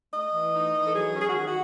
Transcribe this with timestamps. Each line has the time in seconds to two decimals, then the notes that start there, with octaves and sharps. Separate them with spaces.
0.13 A3 D#5
0.33 E3
0.54 D#4
0.74 E3
0.86 A4
0.93 F#3 G#4
1.13 C#4
1.21 G#4
1.28 F#4
1.34 D#3 G#4
1.48 F#4